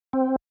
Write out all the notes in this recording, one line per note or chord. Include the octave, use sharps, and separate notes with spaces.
C4